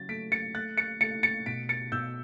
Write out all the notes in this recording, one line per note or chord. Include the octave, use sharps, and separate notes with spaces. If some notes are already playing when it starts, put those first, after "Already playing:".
Already playing: C#3 F#3 A6
A3 B6 D7
A6 C#7
A3 F#6 A6
A6 C#7
A3 A6 C#7
A6 C#7
B2 B6 D7
A6 C#7
B2 E6 G6